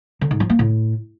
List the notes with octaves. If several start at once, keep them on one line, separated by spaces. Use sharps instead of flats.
D3
G#2
F3
A#3
A2